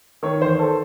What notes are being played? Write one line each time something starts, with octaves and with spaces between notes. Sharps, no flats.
D#3 C#5
E2 C5
A4